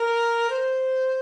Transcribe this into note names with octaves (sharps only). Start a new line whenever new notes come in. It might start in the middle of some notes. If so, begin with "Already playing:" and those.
Already playing: A#4
C5